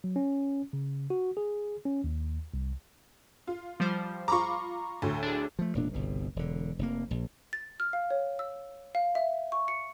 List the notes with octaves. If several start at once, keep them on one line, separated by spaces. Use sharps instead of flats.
F#3
C#4
C#3
F#4
G#4
C#4
D#2
C2
F4
F3 G3 C5
F4 A#5 B5 C#6 D6
D2 A2
D4 G#4
F3 A3
E1 A#2 D4
G1 C2 B2
E1 D3
F1 A#3
A#1
A6
F6
F5
C#5
E6
F5
E5
C#6
C#7